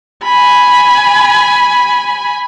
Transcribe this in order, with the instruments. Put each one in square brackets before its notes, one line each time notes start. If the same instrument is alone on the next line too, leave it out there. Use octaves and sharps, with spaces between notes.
[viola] G#5 B5